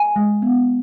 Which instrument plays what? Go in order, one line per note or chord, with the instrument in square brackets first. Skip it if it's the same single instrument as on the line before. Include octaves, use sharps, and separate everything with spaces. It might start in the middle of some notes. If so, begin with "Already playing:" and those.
Already playing: [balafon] G#5
G#3
B3